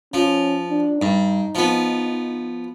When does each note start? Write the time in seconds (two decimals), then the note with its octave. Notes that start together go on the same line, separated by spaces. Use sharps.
0.14 F3 C#4
0.70 D4
1.02 G2 D#4
1.55 F3 B3